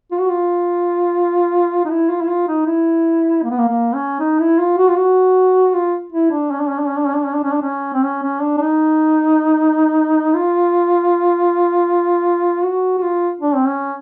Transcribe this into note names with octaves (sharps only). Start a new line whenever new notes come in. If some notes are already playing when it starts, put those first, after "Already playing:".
F4
F#4
F4
D#4
E4
F4
E4
F4
D#4
E4
A#3
B3
A#3
A#3
C#4
D#4
E4
F4
F#4
F4
F#4
F4
E4
D4
C#4
D4
C#4
D4
C#4
D4
C#4
D4
C#4
D4
C#4
D4
C#4
C4
C#4
C#4
D4
D4
D#4
F4
F#4
F#4
F4
D4
C4
C#4